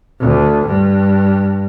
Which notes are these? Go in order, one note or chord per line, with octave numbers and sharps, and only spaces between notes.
D2
G2